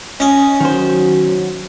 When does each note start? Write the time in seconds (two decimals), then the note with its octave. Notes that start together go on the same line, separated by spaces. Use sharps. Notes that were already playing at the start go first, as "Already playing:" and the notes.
0.20 C#4 D#5
0.60 D#3 F#3 C5